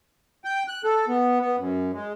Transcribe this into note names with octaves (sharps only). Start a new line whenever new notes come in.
G5
F#6
A4
B3
B3
F#2
G#3